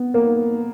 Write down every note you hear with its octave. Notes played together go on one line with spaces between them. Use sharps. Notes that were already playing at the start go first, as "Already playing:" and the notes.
Already playing: B3
A#3